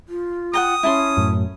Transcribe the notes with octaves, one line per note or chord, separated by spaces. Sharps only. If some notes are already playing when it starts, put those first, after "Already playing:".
F4
F#5 G5 A#5 D#6
C#4 E4 A5 C6
F#2 A2